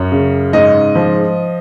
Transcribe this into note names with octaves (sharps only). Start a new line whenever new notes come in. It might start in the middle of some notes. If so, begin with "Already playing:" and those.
Already playing: F#2
C#3
G#2 D#5
F3